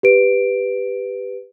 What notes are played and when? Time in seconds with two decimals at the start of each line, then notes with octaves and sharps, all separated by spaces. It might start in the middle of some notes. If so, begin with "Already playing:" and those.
0.03 G4 B4 D7